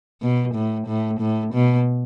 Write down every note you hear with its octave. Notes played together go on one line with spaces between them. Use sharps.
B2
A2
A2
A2
B2